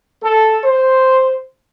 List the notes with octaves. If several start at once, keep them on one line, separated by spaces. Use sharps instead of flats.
A4
C5